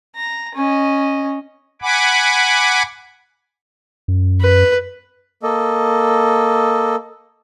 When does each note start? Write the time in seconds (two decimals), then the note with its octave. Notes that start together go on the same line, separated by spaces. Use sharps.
0.15 A#5
0.55 C#4 D#5
1.82 F#5 G#5 B5 D6
4.08 F#2
4.41 B4
5.43 A#3 A4 D#5